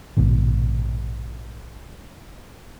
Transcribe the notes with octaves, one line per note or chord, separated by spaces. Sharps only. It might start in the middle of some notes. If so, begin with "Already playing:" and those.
A#1 G#2 B2 D#3